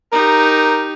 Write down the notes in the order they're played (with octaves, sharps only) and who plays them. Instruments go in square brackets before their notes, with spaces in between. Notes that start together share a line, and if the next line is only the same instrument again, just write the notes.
[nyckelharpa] D#4 G4 [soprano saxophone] A#4